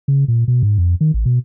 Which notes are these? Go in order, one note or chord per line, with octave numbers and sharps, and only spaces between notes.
C#3
A#2
B2
G#2
F2
D#3
A1
B2